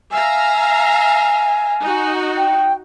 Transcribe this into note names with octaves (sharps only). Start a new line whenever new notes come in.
E5 F5 G#5 A#5
D#4 F#4
G5